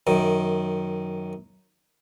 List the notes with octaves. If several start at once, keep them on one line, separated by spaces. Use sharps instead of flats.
F#2 D#3